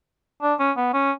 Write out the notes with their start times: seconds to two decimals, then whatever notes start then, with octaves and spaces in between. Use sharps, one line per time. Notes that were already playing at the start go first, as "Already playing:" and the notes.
0.42 D4
0.59 C#4
0.77 B3
0.94 C#4